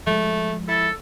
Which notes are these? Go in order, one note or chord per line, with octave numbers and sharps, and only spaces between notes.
F3 G#3 A3
E4 A4